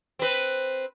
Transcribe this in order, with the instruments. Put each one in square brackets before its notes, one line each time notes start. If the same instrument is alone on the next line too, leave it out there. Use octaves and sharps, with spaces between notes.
[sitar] C4 B4